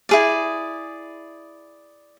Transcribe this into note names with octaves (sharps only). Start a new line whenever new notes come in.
E4 G#4 D5